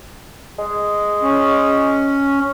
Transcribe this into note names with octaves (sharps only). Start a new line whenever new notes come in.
G#3
C#4